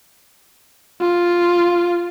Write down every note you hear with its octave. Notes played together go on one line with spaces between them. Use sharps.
F4